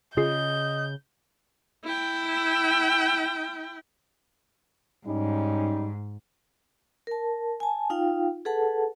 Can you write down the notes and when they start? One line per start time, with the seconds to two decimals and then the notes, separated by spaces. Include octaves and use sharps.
0.17 C#3 F4 G#4 D#5 G6 C7
1.84 E4 G5
5.07 G#2 G3 C#4 D#4
7.07 A#4 A5
7.60 G#5 A5
7.90 D#4 F4 F5 G5
8.45 G#4 A4 B4 F#5 A5